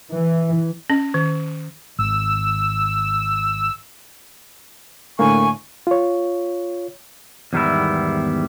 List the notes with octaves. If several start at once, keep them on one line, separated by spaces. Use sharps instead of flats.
E3
C#4
D#3
G#1 E6
A2 D3 A#3 G#5 C#6
F4 C#5
E2 G#2 D#3 G3 B3 E4